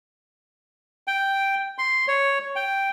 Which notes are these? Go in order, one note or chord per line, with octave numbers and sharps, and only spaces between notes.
G5
C6
C#5
G5